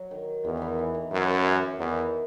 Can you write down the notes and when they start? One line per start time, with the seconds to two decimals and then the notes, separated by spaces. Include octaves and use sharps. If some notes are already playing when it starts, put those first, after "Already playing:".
Already playing: F#3
0.11 D#3
0.44 E2 D#3
0.57 D#3 E3
0.79 E3
0.94 D#3
1.12 F#2 E3
1.45 E3
1.79 E2 D#3